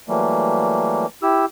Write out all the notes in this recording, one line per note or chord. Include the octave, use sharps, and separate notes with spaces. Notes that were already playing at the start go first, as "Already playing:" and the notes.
E3 F#3 G3 A3 A#3
E4 G4 E6